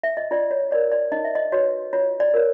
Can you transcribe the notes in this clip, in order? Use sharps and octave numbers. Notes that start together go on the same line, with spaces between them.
E5
D#5
F4 D5
C#5
A#4 C#5 D5
D5
D#4 D#5
E5
D#5
F#4 B4 C#5
F4 C#5
D5
A#4 C#5